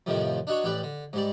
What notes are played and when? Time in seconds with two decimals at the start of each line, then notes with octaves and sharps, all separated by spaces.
0.06 F2 A2 C3 D#3 F3
0.47 D4 D#4 F#4 C#5
0.64 A1 G4 B4 D5
0.83 D3
1.13 G#2 G3 D5